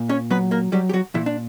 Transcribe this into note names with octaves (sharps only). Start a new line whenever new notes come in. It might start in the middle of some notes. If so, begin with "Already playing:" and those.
Already playing: A#2
C#4 C#5
F#3 B3 B4
A#3 A#4
F#3 G3 G4
G4
F#3 F#4
A#2 E3 E4
D4